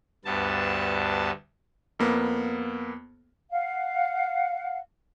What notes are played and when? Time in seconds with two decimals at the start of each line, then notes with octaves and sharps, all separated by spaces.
0.25 D2 G2 B3 A5
1.99 F2 A#3 B3
3.52 F5 F#5